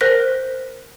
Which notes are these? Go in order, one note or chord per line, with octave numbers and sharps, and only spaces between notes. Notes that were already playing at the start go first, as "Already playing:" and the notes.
A#4 C5 F#6 A#6 B6